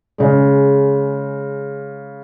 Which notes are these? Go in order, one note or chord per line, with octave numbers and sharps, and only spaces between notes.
C#3 G#3